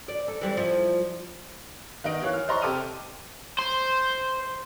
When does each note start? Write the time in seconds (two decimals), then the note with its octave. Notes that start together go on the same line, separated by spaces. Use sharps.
0.08 D5
0.28 A4
0.41 E3 G3 C4
0.57 F3 E4
2.04 D#3 B3 D#4 D#5 D7
2.22 E3 C#5 F5 F#6
2.34 F6
2.48 C5 D5 D#5 A#5 C6 C#6
2.62 C3 G4 A4 D6 F6 D#7
3.59 C5